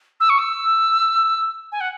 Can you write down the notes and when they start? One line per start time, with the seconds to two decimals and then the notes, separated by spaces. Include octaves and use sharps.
0.20 E6
0.29 C#6
0.39 E6
1.72 G#5
1.80 F#5